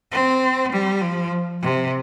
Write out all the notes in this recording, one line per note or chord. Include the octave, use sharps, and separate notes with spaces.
C4
G3
F3
C3